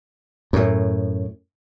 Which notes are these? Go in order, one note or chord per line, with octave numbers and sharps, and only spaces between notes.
F#2 A2